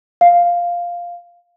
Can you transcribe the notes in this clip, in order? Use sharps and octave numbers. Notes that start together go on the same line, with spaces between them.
F5